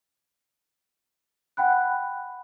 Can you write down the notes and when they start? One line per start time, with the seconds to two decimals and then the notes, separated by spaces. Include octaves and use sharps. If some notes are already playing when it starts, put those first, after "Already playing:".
1.57 F#5 G5 B5 F#6